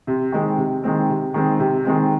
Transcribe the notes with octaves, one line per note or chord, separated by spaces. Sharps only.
C3
D#3 G#3 C4
C3
D#3 G#3 C4
C3
D#3 G#3 C4
C3
D#3 G#3 C4